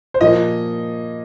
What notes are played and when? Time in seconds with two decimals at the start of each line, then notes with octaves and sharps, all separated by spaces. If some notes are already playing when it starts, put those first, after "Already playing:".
0.14 C5
0.21 A#2 F3 A#3 D#5